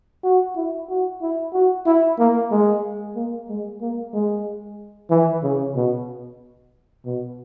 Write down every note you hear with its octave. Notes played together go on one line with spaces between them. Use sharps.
F#4
E4
F#4
E4
F#4
E4
A#3
G#3
A#3
G#3
A#3
G#3
E3
C#3
B2
B2